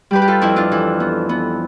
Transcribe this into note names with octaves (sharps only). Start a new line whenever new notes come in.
G3 G4 B4
G4
F4 A4
F2 E4
D4 F4
E3
B3
B3